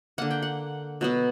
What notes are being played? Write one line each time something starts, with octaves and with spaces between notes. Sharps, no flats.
D3 A#3 F#5
G5
F#5
B2 F#3 B3